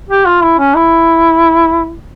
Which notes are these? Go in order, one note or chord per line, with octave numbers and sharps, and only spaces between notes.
G4
F4
E4
C#4
E4